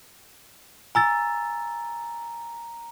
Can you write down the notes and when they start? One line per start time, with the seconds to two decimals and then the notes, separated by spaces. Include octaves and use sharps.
0.95 G#5 A#5 E6 A6